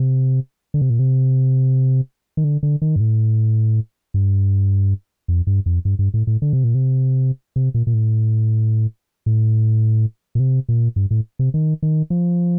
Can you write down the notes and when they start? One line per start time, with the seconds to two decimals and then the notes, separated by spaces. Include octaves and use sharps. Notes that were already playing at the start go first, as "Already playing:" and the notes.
Already playing: C3
0.74 D3
0.82 C3
0.90 A#2
0.99 C3
2.37 D#3
2.44 D3
2.63 D3
2.82 D#3
2.96 G2
3.00 A2
4.14 G2
5.28 F2
5.47 G2
5.66 F2
5.85 G2
5.99 G2
6.14 A2
6.27 A2
6.42 D3
6.53 C3
6.64 A#2
6.75 C3
7.56 C3
7.74 A#2
7.87 A#2
7.94 A2
9.26 A2
10.35 A#2
10.40 C3
10.69 A#2
10.96 G2
11.11 A2
11.39 C3
11.54 D#3
11.83 D#3
12.10 F3